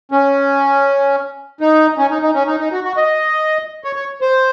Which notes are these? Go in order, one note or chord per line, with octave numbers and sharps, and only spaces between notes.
C#4
D#4
C#4
D#4
D#4
C#4
D#4
D#4
F#4
F#4
D#5
C#5
C#5
C5